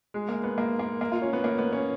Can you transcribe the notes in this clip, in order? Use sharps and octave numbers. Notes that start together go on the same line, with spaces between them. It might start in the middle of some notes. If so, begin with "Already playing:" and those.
G#3
A#3
B3
A#3
A#3
A#3
F4
C#4
B3
A#3
B3
C#4